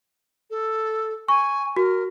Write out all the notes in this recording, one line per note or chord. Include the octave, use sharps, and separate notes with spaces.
A4
G#5 C#6
F#4 A#4